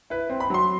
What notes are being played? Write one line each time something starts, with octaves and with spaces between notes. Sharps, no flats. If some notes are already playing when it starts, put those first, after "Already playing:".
E4 B4
C4
B5
F#3 C6